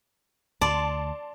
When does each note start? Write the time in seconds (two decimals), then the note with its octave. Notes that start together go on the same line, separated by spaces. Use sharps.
0.61 D2 D5 A5 C6